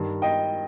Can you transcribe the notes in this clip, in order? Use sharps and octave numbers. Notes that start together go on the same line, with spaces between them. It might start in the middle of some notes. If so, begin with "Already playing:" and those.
Already playing: G2 D#3
D#5 G5